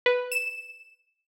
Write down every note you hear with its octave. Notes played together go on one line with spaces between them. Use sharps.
B4
E7